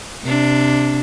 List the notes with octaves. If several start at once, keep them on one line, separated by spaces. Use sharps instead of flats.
C3 D4